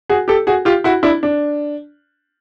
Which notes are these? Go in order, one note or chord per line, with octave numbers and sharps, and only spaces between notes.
F#4 G#4
G4 A4
F#4 G#4
F4 G4
E4 F#4
D4 E4
D4